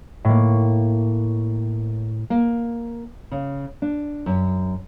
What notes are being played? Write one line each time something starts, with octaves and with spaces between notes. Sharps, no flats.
A2 A#3
A#3
C#3
D4
F#2